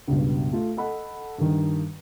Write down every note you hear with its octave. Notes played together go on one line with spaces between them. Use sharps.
C#2 G2 B2
A3 F4
A4 D#5 F#5 B5
G2 D#3